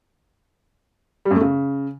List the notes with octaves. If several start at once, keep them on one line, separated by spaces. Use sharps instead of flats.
G3
F#2
A3
C#3